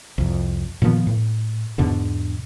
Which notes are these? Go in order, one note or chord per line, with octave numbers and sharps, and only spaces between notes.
C2 F2
A#2 D#3 F3 B3
A2
E2 G#2 B2 D3